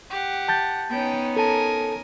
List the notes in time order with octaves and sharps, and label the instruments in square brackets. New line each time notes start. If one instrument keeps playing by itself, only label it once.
[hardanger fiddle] G4 F#5
[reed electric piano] A5 G6 A6
[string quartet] B3 C#4 D#4 [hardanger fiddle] G5
[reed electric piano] A4 A5 [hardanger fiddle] A#4 G#5